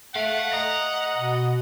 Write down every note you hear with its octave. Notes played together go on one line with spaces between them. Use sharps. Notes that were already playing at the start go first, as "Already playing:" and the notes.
A3 F5 F#5
D#5 A#5
B2